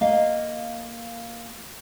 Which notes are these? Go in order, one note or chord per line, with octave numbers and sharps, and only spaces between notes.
A#3 D#5 F5